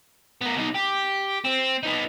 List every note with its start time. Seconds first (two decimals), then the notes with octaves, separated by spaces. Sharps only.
0.41 B3 A#4
0.56 B2 D#4
0.74 G4
1.44 C4
1.83 B3 D#4